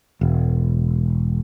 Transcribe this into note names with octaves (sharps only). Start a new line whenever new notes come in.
E1